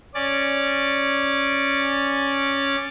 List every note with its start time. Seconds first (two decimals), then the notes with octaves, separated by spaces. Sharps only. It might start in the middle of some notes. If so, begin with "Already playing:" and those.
0.14 C#4 D5